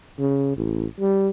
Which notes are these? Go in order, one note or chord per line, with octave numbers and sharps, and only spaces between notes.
C#3
A1
G3